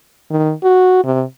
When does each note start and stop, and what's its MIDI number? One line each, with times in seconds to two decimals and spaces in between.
0.30 0.52 51
0.64 0.99 66
1.04 1.23 48